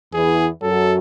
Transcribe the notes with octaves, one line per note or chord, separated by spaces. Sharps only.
E2 E3 G#4
F#2 F#3 A4